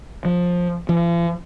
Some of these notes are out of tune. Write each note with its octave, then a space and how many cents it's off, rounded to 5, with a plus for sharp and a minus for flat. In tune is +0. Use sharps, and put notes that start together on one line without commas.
F3 +15
F3 -45